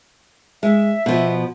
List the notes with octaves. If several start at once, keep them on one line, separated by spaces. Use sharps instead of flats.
G#3 E5
B2 F3